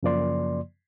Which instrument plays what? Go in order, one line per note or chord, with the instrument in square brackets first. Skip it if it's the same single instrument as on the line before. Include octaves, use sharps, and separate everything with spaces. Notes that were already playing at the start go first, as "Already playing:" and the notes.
[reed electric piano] F#2 C#3 F3 A#3 D5 C6